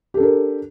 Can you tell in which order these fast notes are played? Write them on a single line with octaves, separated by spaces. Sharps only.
G4 A4 D4 A#4